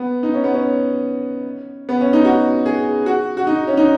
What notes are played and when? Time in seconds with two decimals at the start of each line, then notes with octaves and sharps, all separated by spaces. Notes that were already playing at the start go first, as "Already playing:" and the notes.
Already playing: B3
0.23 D#4
0.34 C#4
0.44 B3
0.54 C#4
1.89 B3
2.01 C#4
2.13 D#4
2.25 F#4
2.66 G#4
3.06 F#4
3.37 F#4
3.47 D#4
3.67 C#4
3.77 D#4